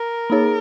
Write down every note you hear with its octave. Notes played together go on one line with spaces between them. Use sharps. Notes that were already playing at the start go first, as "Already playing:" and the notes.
Already playing: A#4
A#3 D#4 G#4 C#5